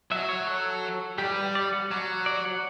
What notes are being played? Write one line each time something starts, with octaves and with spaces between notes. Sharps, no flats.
F#3 E5
C#5
A4
G3 G4
B4
D5
F#5
F#3
D5
F#5